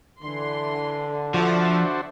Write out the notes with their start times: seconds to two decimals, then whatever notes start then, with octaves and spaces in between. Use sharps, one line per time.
0.22 D3 E3 C6
1.34 F3 D4 F#4 A4 C5 E5